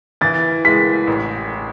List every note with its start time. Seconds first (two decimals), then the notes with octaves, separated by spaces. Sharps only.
0.21 E3 A6
0.65 G#3 B6
1.07 A1